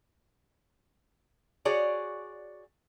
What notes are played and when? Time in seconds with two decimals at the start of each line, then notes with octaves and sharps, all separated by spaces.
1.65 F#4 G#4 C#5 D5